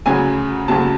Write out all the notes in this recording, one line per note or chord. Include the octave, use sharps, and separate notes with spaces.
D2 C#3 F#3 G#5
D2 C#3 F#3 A5